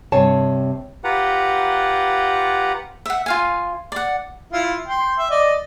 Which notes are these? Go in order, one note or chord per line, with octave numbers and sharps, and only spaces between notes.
G2 C3 C#5 A5
F4 G4 B4 F#5 A#5
E5 F#5
F4 F5 G#5
D5 F#5
E4 F4
G5 C6
E5
D5 D#5